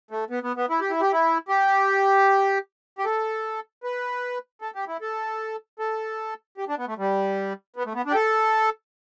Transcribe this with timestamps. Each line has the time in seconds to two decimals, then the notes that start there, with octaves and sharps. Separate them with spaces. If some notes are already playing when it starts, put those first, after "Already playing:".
0.11 A3
0.30 B3
0.43 B3
0.57 B3
0.70 E4
0.81 G4
0.90 E4
1.01 G4
1.13 E4
1.49 G4
2.99 G4
3.05 A4
3.84 B4
4.62 A4
4.76 G4
4.88 E4
5.01 A4
5.79 A4
6.58 G4
6.68 D4
6.78 B3
6.87 A3
6.98 G3
7.76 B3
7.86 A3
7.95 B3
8.06 D4
8.11 G4
8.15 A4